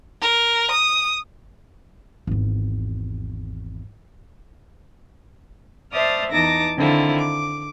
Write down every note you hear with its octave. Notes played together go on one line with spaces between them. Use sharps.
A#4
D#6
G#1 E2
C5 D5 E5 A5 D#6 F6
E2 D#4 A5 D6 A#6
D3 D#3 C4 E4 F4
D6